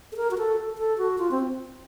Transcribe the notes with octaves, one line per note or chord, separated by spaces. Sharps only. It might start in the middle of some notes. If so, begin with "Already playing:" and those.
A4
A#4
F#4
A4
A4
F#4
F4
C4